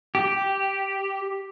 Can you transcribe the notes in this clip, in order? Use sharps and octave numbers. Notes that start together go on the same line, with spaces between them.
G4